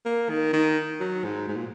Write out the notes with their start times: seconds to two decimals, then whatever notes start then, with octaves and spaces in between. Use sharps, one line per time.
0.06 A#3
0.30 D#3
0.53 D#3
1.00 F#3
1.25 G#2
1.48 G#2
1.57 A#2